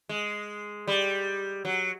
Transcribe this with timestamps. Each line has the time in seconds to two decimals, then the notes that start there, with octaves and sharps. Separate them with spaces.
0.09 G#3
0.87 G3
1.65 F#3